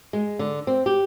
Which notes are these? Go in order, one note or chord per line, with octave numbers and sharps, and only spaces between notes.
G#3
D3
C4
G4